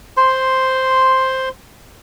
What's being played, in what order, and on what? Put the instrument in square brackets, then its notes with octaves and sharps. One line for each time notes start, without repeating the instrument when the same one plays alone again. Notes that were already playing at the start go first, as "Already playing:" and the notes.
[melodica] C5 C6